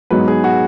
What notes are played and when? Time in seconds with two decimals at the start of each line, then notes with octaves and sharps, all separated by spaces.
0.10 G#2 F#3 B3 D#4 B4
0.28 G#4
0.44 F#4